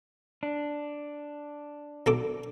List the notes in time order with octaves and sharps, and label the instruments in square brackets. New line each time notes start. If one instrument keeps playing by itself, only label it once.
[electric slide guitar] D4
[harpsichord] B1 A4 D6